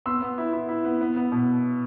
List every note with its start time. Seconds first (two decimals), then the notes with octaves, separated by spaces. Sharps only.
0.06 B3 C6 E6
0.22 B3
0.38 E4
0.53 E4
0.69 E4
0.85 B3
1.01 B3
1.16 B3
1.32 B2